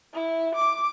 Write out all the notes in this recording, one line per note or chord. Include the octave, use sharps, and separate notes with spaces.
E4
D6